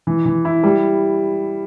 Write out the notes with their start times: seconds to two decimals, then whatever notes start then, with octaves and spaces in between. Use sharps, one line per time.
0.07 E3
0.26 E3
0.45 E4
0.64 G3